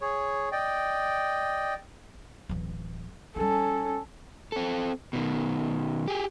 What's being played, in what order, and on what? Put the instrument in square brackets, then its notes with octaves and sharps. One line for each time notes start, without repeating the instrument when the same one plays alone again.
[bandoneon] G#4 C#5
D5 D#5 G5
[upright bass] D1 E3
[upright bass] G3 D#4 [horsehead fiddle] C#4 A4
[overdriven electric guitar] C4 A4
B2 D#3
G4 G#4